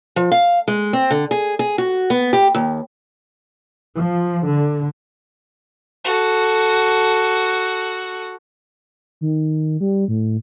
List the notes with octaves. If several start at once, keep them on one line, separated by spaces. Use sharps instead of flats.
F3
F5
G#3
C4
D3
G#4
G#4
F#4
B3
G4
D#2
F3
D3
F#4 A4
D#3
G3
A2